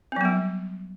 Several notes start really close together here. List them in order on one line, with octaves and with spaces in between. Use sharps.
C4 F#3 B3 G3